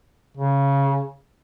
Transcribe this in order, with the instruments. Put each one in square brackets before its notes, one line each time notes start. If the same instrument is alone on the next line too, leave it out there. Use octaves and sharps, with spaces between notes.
[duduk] C#3